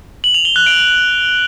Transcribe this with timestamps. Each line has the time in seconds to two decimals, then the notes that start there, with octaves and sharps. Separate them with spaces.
0.24 F#7
0.35 F7
0.45 G7
0.56 F#6
0.66 D7